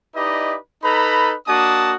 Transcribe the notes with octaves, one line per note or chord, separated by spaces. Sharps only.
D#4 E4 G4 B4 D5 D#5
D#4 A4 B4 A#5 B5
A#3 D4 F#4 D#5 A5 D#6